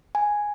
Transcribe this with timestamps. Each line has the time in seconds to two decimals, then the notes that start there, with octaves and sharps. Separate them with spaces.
0.15 G#5